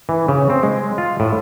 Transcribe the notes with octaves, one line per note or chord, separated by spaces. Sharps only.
E3
C#3
C4
G#3
F4
A2